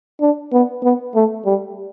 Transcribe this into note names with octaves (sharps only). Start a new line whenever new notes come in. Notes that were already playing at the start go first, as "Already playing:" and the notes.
D4
B3
B3
A3
G3